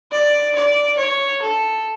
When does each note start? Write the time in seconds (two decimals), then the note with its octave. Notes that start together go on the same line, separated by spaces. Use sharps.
0.12 D5
0.55 D5
0.99 C#5
1.42 A4